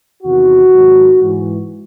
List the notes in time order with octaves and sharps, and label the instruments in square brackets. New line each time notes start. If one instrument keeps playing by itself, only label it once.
[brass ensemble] E2 C3 D#3 F#4
G#2 D#3 F#3
G#2 E3